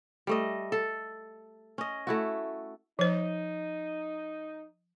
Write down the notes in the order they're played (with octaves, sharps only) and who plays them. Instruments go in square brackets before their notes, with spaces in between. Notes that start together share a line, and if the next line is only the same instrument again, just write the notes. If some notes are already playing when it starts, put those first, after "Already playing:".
[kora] G3 A3 D#5
A4
C#4 D#5
A3 E4 F#4
[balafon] F3 C5 [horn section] D#4